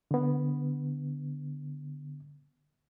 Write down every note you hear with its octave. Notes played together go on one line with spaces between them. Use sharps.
D3 B3